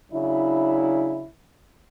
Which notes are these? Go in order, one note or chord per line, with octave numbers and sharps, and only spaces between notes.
C#3 F#3 D4 E4